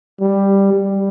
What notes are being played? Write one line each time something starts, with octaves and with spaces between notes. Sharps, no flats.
G3
G3